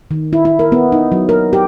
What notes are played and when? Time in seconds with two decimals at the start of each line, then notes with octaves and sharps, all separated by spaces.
0.11 D#3
0.33 E4
0.45 E4
0.59 A#4
0.72 B3
0.92 D#4
1.12 F#3
1.29 A#4
1.53 G4